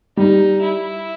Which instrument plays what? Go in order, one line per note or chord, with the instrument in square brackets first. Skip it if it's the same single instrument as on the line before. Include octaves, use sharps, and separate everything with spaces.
[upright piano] G3 [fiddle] D#4
[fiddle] E4